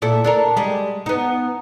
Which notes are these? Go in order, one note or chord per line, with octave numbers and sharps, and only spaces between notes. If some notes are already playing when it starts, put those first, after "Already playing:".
A#2 E4 A4
D4 A4 A#4
G3 G#3
B3 D#4